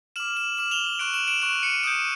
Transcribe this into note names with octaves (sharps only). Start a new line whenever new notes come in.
D6 F6 E7 F#7
E7 F#7
D6 F6 E7 F#7
F7 G7
C#6 F#6 D7 E7
E7 F#7
D7 E7
C#6 F#6 D7 E7
C#7 D#7
D#6 G6 D7 E7